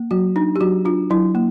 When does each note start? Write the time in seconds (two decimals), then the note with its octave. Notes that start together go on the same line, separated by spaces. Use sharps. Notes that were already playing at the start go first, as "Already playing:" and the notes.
Already playing: A#3
0.11 F#3 F#4
0.36 D4 D#4
0.56 G4
0.61 F#3 F#4
0.85 D4 F4
1.10 F#3 E4
1.35 A#3